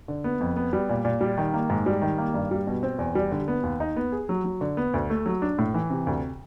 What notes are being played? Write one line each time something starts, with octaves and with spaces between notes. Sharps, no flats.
D3
B3
F2
B3
G3
A#2
A#2
G3
D#3
A#3
G#2
G3
D#3
A#3
G2
G3
B2
C4
E2
G3
D3
B3
D#2
D#4
B3
G#4
F#3
F#3
D3
B3
D2
A3
F#3
D4
A2
E3
C3
D2